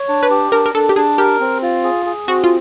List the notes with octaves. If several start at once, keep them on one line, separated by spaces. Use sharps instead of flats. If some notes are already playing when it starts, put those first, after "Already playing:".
Already playing: C#5
D4
B4
G4
D4 A#4
A#4
D4 A4
G4
D4 G#4
G4 A#4
C4
F4
G#4
G#4
C4 F#4
F4